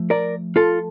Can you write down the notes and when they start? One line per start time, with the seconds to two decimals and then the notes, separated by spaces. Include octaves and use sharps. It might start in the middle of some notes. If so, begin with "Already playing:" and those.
Already playing: F3 A3
0.10 A#4 D5
0.56 F4 A4